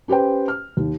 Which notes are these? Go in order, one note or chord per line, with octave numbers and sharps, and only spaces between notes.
C#4 G4 B4 C5 G5
F6
D#2